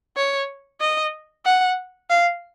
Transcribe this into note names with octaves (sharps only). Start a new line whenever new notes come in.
C#5
D#5
F#5
F5